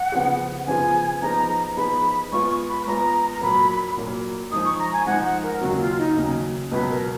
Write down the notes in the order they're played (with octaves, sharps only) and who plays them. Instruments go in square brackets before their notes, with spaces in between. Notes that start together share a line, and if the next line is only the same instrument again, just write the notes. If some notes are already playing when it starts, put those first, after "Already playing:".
Already playing: [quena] F#5
[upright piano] C#3 F3 B3 F4 G#4
[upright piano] C#3 F3 B3 F4 G#4 [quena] G#5
[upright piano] F3 B3 D#4 G#4 [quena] A#5
[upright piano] F3 B3 D#4 G#4 [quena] B5
[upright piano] G#3 B3 F4 [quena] C#6
[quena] C#6
B5
B5
[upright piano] G#3 B3 F4 [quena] A#5
[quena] A#5
[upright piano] A#2 F#3 A#3 [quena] B5
[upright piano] A#2 F#3 A#3
[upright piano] F3 G#3 D#4 [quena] D#6
[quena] C#6
A#5
G#5
[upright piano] F3 G#3 D#4 [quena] F#5
[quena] F#5
A#4
[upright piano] D#2 C#3 F#3 [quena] F#4
[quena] F4
D#4
[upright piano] D#2 C#3 F#3
[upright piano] C#2 B2 F#3 [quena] B4
[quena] A#4